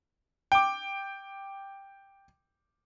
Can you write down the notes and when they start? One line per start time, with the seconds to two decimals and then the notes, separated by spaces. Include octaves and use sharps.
0.52 G5 D6